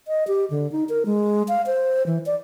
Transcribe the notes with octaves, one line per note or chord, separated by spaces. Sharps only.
D#5
G4
D3
D#4
A#4
G#3
F5
C5
E3
D5